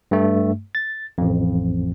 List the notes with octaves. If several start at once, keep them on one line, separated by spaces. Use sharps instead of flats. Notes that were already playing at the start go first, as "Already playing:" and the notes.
G2 A3
A6
A1 F2